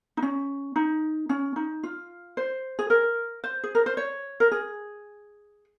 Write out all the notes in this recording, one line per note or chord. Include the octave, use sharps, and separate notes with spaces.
D#4
C#4
D#4
C#4
D#4
F4
C5
G#4
A#4
C5
G#4
A#4
C5
C#5
A#4
G#4